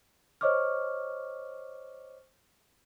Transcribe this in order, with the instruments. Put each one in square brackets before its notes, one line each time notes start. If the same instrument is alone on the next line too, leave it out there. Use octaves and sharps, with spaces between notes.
[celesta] C5 C#5 D#5 C#6 D6 F6